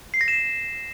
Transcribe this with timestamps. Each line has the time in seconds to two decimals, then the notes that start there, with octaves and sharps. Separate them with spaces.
0.14 C7
0.21 A#6
0.28 E7